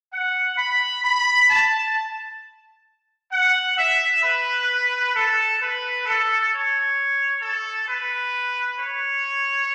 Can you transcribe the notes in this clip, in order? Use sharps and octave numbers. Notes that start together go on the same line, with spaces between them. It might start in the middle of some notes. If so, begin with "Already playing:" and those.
F#5
B5
B5
A5
F#5
E5
B4
A4
B4
A4
C#5
A4
B4
C#5